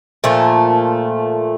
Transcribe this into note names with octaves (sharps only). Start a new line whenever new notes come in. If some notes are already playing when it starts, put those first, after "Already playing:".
A#2 F3 A3